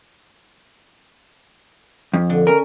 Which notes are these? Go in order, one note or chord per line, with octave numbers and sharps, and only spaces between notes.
F2
D3
C#4 A#4